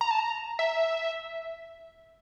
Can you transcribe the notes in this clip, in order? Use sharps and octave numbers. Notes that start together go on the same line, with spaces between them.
A#5
A5
A#5
E5